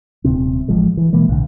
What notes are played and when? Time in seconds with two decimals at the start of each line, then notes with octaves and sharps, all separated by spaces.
0.24 D#1 C#2 C3 C4
0.68 A1 F3 G#3
0.97 E3
1.13 B2 E3 G#3 A#3
1.29 B1 A2 D3